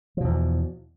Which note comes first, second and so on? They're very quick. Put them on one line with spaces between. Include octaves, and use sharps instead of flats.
F3 B2 E2